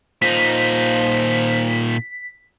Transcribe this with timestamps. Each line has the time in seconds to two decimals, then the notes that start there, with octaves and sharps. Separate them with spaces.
0.22 A#2 F3 D#4 B6